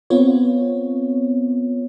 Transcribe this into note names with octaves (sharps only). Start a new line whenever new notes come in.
B3 C4 F4 C#5